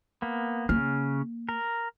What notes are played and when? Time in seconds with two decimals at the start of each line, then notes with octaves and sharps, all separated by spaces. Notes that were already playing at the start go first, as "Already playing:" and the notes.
0.22 A#3 B3
0.69 C#3 A#3 F6
1.49 A#4